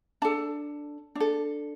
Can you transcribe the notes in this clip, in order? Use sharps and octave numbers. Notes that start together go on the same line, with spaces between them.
D4 A4 A5
D4 A4